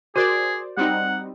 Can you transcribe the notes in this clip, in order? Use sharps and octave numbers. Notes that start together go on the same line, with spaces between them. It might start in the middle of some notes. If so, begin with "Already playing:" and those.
F#4 G#4 A#4 C5 D5
G3 C4 D#4 F#5